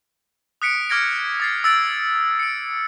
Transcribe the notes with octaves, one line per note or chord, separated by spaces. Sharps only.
D#6 F#6 B6 C#7 D7
D6 F6 G#6 A#6 D7
D#6 A6 C7
E6 A6 D7
C#7 D7